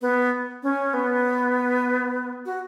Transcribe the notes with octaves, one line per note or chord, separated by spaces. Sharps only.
B3
C#4
B3
F#4